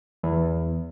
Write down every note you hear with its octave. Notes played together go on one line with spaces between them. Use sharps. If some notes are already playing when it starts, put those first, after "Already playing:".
E2